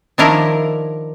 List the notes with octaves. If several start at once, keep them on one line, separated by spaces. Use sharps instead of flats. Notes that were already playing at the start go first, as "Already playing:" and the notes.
D#3 F3 D4 E4 A#4 A#5